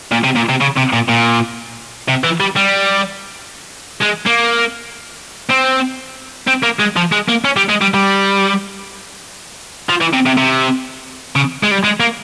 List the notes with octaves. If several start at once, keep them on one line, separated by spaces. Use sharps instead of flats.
A#2
C3
A#2
C3
C#3
C3
A#2
A#2
C3
E3
G3
G3
G#3
A#3
C4
C4
A#3
G#3
F3
G#3
A#3
C#4
G3
G#3
G3
G3
F3
E3
C3
C3
C3
C#3
G#3
G3
G#3
A#3